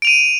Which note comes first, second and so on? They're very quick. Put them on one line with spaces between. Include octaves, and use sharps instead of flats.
D7 F7 D#7